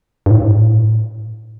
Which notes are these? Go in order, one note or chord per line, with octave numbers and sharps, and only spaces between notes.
G2
A2